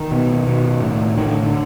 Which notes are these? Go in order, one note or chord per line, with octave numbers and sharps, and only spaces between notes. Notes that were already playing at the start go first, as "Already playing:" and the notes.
Already playing: D#3
B2
B2
A2
A2 D#3
D3
D3